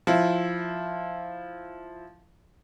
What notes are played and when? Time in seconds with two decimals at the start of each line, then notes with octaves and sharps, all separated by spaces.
0.07 F3 E4